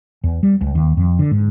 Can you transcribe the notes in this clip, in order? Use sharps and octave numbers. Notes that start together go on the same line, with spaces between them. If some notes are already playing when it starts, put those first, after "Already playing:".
E2
G3
C#2
D#2
F2
D3
G#2